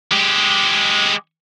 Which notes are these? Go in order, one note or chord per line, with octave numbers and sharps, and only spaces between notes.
G#3 G4